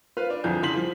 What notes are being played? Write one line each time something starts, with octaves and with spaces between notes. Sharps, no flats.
F4 B4 C5 F5
D4
C2 F2 D3 F3 G#4 G6
C#3 E3 C6 B6 F#7
F3